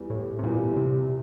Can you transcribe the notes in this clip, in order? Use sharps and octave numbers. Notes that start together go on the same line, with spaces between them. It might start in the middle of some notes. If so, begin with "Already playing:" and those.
Already playing: E2 E3 G3
A2
C3
E2 A#2 E3 G3
C3